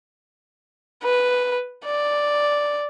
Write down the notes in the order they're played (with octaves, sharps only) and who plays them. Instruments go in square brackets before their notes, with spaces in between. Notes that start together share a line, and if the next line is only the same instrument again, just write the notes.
[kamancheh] B4
D5